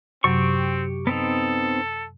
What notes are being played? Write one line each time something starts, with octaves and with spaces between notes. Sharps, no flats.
F#2 C3 F#3 C4 G4 C#6
B3 C4 D#4 A4